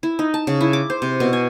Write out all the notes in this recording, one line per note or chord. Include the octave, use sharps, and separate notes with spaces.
E4
D#4
A5
C#3
E4
D6
C5
C3
B2
G#5